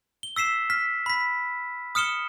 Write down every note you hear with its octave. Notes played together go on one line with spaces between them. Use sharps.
G7
E6 B6 C7 E7
F6 B6
B5 B6
D#6 F6 C#7 E7 G7